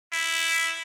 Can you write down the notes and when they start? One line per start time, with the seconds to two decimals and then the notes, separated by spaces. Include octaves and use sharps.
0.12 E4